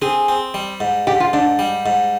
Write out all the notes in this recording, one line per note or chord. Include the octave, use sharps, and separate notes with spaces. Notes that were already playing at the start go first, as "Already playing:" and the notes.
C4 G#4
C4
G3
G#2
G#2 G4
F4
G#2 D4
G3
G#2